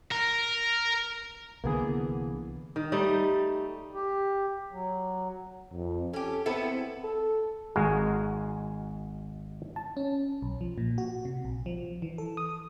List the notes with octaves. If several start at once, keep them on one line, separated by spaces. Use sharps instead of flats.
A#4
C2 D3 E3 A#3 B3 G#4
D#3
G3 A3 D#4
G4
F#3
F2
C#4 G4 A4
B3 C4 E4 A4
A4
G#1 G#3 F#4 G#4 A#4 F5
A5
C#4
B1
F3
A#2
F#4
C3
A#1
F3
E3
A4
D#6